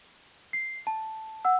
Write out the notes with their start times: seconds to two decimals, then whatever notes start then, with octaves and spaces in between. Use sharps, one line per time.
0.53 C7
0.87 A5
1.45 F#5 E6